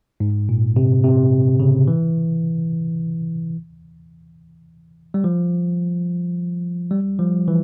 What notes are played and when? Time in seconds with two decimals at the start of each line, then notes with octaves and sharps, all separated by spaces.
0.20 G#2
0.49 A#2
0.76 C3
1.04 C3
1.60 C#3
1.88 E3
5.14 G3
5.24 F3
6.91 G3
7.19 F3
7.48 E3